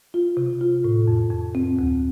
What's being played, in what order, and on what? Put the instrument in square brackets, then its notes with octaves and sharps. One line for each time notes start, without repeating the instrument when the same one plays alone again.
[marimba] F4
C3
F4
A2
F2
F2
C4
D2